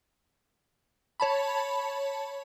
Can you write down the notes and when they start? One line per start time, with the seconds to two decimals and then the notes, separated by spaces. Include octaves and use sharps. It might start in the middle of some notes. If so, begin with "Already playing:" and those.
1.20 C#5 A5 B5